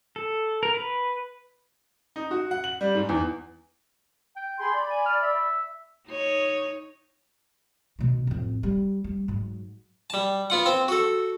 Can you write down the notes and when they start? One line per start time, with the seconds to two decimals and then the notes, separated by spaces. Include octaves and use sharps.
0.16 A4
0.63 A#4
0.75 B4
2.16 D#4
2.31 F#4
2.51 F#5
2.64 F#7
2.81 G3
2.95 G#2
3.09 E2
4.36 G5
4.57 G#4 B5 C6
4.71 D5 B5
4.90 G#5
5.06 F6
5.22 E5
6.08 D#4 C#5
7.99 B2 D#3
8.27 A1 F2
8.63 G3
9.04 G3
9.28 G#2 F#3
10.10 G3 A5
10.50 B3 F4 F#5
10.66 C4 C5
10.88 F#4 A4